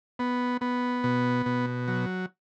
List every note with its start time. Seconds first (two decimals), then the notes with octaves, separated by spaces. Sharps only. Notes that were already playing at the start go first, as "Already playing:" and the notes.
0.19 B3
0.61 B3
1.04 B2
1.46 B2
1.88 F#3